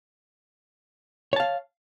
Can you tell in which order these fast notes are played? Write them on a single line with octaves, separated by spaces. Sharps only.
C#5 A5 F5